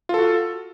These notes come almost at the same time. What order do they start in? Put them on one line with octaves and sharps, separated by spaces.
F4 A4 F#4